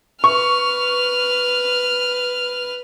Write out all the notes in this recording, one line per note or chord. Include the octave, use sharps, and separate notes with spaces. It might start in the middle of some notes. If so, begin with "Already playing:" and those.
B4 C#6 F6